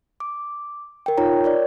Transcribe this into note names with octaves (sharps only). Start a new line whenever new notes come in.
D6
A#4 G5
D#4 F4 C#5 A#5
A#4 C#5 D5